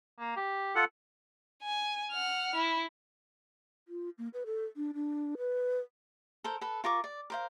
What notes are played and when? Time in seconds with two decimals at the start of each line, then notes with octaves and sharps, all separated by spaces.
0.19 A#3
0.37 G4
0.75 F4 A4 F#5
1.63 G#5
2.12 F#5 F6
2.55 E4
3.88 F4
4.18 A#3
4.34 B4
4.46 A4
4.77 D4
4.94 D4
5.38 B4
6.44 A4 A#4 C5
6.61 A4 B4
6.84 F4 A#4 C#6 D6
7.04 D5
7.30 A#4 C5 F5